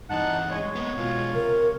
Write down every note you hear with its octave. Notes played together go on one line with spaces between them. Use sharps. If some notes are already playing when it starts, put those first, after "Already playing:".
G2 E3 D#4 F#5 A5
G#3 C#5
A#3 B3
B2 G#3 F4
C3 A#4